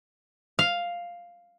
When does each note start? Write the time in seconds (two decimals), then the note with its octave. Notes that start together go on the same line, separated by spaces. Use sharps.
0.59 F5